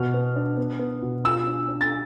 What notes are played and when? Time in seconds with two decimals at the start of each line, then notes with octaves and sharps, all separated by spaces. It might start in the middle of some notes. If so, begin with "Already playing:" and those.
Already playing: B2 F6
0.14 B3
0.36 D4
0.57 B3
0.79 B3
1.02 B2
1.24 F4 E6
1.47 D4
1.69 D4
1.81 A6